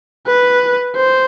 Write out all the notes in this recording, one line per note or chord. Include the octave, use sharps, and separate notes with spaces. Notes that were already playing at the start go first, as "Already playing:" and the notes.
B4
C5